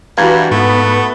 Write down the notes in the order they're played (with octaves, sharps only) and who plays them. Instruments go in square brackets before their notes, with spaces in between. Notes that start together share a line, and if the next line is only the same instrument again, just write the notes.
[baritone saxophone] G2 [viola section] E3 F#4 [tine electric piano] F5 A#5 G#6
[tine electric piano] G#2 [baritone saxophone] A3 [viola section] B3